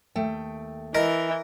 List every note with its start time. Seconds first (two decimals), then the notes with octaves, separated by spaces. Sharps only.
0.16 D#2 A3 G5
0.95 E3 A#4 D#5